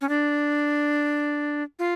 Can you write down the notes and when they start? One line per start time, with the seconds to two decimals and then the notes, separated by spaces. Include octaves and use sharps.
0.01 C#4
0.09 D4
1.79 F4